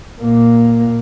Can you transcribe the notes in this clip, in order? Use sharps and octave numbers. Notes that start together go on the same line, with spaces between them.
A#2 A#3